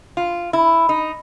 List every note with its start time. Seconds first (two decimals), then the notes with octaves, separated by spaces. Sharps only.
0.17 F4
0.53 E4
0.89 D#4